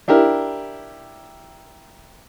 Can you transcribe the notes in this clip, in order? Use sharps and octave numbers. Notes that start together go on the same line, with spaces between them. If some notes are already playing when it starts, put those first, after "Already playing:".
D4 E4 G4 A#4